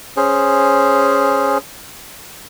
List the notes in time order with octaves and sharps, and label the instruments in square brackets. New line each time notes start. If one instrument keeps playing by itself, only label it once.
[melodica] C#4 G#4 C5